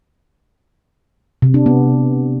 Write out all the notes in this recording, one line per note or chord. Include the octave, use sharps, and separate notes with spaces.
C3
D4
B3